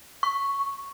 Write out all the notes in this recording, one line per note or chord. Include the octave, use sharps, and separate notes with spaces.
C#6